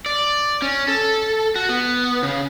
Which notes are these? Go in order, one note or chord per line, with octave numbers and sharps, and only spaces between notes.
D5
C#4
A4
F#4
B3
C#3